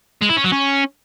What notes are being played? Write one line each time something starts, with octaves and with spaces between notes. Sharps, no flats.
G#3
E4
C#4
F#3
C#4